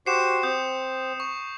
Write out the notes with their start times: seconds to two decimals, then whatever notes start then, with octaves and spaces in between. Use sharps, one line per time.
0.06 F#4 G4 C5 C7 C#7 E7
0.43 C4 D#6 G6
1.20 C#6